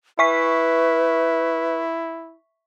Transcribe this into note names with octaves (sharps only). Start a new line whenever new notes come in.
E4 B4 E5 C#6 B6